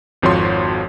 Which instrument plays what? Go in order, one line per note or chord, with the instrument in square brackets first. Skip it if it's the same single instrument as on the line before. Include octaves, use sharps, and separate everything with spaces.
[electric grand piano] G#1 F2 F3 F#4 C#5 C6